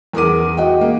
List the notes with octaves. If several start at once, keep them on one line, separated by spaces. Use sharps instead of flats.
E2 G#4 A#4 D6 D#7
F#4 D#5 F#5 G5
A#3